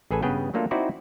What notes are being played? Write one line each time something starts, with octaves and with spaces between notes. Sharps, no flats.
A1 G#4 A4 B4 G#5
G2 C#3 B3 G#4 B4 G5
F#3 A3 A#3 D4 F4 A4
C4 D#4 E4 F#4 C5 D5